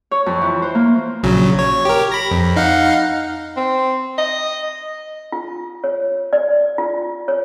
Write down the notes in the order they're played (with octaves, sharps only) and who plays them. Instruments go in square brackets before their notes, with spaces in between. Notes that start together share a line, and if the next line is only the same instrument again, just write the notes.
[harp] C#5
F2
E3
C5
A#3
[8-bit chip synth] A#1 C#3 F#3
C#5
G4 A#4
B5 A#6
F2
D#4 F5 F#5
[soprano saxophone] C4
D#5
[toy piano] F4
C#5
D5
F4
C#5